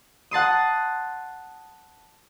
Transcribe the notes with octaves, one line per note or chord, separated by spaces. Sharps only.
F#5 A5 C6 D#6